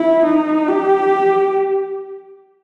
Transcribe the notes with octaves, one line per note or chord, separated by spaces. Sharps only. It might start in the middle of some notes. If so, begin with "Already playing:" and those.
Already playing: E4
D#4
G4